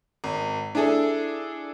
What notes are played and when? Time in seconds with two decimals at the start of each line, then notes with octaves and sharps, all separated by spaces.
0.24 G#1
0.75 D4 E4 G#4 A4